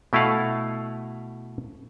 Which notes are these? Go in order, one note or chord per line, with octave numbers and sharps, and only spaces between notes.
B2 A3 E4 D#5 F5 F#5